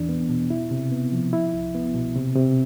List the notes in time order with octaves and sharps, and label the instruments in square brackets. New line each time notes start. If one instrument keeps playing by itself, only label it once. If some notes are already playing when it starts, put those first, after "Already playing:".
Already playing: [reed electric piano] E2 E3 D4
B3
B2
E4
C3
B3
F3
E4
C2
B3
B2
C3
C3